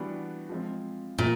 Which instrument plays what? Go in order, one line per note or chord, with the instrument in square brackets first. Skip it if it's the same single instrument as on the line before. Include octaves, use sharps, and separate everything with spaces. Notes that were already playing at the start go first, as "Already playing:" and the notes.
Already playing: [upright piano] E3 G3 B3 D4 F#4
F3 G#3 C4
[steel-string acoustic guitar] A#2 [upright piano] G#3 C4 F4